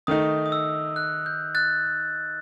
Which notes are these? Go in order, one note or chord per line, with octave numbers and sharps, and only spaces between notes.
D#3 A3 D#4 D#6
D#6
E6
F#6
G6
F#6 A6